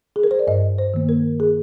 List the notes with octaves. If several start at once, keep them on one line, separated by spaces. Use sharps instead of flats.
G#4
A#4
C5
D5
G2 D#5
C5
D#3 A#3
A#4
G#4